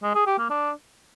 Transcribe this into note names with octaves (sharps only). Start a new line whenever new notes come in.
G#3
G#4
G4
A#3
D4